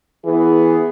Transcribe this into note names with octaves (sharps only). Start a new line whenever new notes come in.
E3 B3 G#4